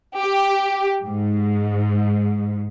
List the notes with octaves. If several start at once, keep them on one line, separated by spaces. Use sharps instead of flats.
G4
G#2